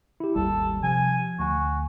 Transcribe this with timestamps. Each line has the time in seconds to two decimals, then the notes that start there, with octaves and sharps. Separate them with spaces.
0.20 E4 G4
0.36 G#1 D#2 G3 A4
0.83 C3 F3 G#5
1.39 D2 F#4 G#5